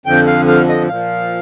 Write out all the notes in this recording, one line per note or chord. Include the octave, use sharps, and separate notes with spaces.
F2 D3 F3 G5
F5
F5
D#5
A#2 F3 F5